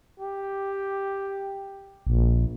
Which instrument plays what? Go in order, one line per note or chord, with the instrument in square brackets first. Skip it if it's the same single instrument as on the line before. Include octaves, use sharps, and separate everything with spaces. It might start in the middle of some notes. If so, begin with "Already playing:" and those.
[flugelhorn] G4
[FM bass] A#1